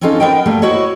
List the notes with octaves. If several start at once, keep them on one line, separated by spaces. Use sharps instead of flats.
C4 C#4 D#4 F4 A4
B3 D#4 A#4 C5 D#5 G5
G3 A3 A#3
E4 F#4 C5 C#5 D#5